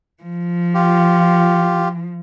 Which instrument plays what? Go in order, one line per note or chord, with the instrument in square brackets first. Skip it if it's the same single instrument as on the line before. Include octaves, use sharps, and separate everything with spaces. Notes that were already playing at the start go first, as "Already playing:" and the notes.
[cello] F3
[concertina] F4 G4